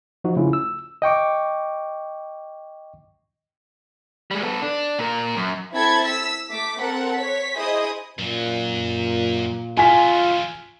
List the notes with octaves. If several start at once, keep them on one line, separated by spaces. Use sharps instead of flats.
F3 D#4 F#4
C#3 A3 C#4 E4 F4
E6
D#5 G5 C#6 D6
G3 G#3
B3 A4
D4
A#2 A#4
F#2
C4 E4 A4 A5 B5 G#6
E6 B6
A3 D6 B6
C4 A4 A#4 F#5
C#5 B6
E4 G#4 C5 D#5 D#6
F#2 A#2 F#3
F3 F#3 F4 G#5 B6